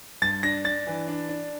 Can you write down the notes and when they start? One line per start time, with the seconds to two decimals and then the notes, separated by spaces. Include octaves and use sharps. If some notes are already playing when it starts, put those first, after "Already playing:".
0.22 G2 A6
0.43 D4 A#6
0.64 D4 A6
0.87 E3
1.08 D4
1.29 D4